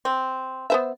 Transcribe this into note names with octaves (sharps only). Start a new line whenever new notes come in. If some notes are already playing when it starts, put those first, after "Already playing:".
C4
B3 C5 E5